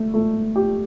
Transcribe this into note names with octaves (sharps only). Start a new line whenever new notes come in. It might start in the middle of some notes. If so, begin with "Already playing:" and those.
Already playing: A3
A3
G4